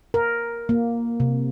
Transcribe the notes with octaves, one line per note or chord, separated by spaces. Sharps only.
A#4
A#3
C3